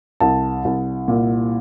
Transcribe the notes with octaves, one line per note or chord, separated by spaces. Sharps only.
C2 A5
C2
A#2